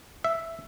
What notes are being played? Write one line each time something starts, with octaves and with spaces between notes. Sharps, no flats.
E5